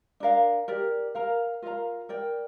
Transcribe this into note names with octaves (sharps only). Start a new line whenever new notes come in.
D4 A#4 F5
G4 A#4 D5
A#4 F5 A#5
F4 A#4 F5 A#5
A#4 D5 G5